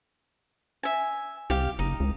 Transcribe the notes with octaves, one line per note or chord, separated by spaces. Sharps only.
E5 G#5
C2 G4 F5
F#1 D#4
C#2